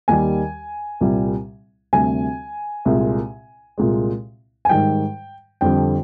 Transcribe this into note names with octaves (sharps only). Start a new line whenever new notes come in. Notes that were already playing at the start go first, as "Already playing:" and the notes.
D#2 D#3 G3 G#5
C2 A#2 G3
D2 C3 G3 G#5
C2 A#2 G#3
C2 A#2 G#3
G#5
G#2 D#3 G3 G5
F2 D3 G3 G5